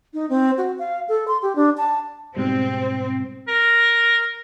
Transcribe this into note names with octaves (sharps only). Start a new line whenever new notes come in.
D#4
C4
F#4
F5
A4
C6
G4
D4
A5
G#2 B2 G3 C4
A#4